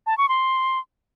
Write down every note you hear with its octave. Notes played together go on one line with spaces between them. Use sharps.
A5
C#6
C6